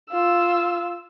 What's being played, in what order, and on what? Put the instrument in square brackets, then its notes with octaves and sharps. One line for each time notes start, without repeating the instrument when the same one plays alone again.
[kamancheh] F4 E6